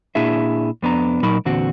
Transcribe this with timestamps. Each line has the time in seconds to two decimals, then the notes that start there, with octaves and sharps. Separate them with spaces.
0.15 A#2 D4 E4 G#4 E5
0.82 F2 B3 D4 A#5
1.23 A#2 F#3 D#4 A#4 B5
1.45 E2 A#2 D3 C4 F#4